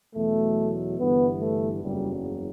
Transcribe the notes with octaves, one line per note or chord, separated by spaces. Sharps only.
E2 B2 F#3 A3
G1 G2 E3 B3
A3
F#1 E2 C#3 F#3 G3